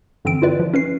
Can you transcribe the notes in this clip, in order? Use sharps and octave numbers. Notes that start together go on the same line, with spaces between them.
G2 D3 E3 C4 D7
E4 F4 B4 D5
F3
C#4 B4 C7